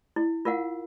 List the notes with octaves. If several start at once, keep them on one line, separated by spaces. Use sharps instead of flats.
E4
F4 A#4 F5 F#5